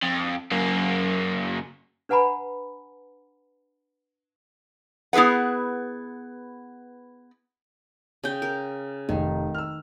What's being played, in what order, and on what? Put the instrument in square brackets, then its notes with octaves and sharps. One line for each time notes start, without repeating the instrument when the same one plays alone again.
[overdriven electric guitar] F2
F#2 A#3
[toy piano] D4 B4 F#5 G#5 A#5 B5
[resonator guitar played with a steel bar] B3 E4 G#4 B4 F#5
[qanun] C#3 G5
A#4
[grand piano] F1 [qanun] D#3
[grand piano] E6 F6